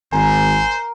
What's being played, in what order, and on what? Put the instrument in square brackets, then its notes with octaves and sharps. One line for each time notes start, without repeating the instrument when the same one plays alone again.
[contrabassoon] G#1 [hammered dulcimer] A#4 [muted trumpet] C5 [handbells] G#5